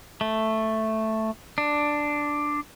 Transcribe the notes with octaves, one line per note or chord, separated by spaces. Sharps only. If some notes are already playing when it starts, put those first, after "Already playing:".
A3
D4